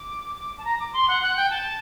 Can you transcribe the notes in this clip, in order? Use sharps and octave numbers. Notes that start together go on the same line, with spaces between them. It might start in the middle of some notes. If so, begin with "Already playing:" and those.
Already playing: D6
A5
A#5
D6
C6
F#5
F#5
G5
A5